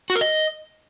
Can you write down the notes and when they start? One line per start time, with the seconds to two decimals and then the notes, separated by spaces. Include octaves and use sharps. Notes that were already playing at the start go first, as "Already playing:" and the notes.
0.10 F#4
0.15 A#4
0.21 D#5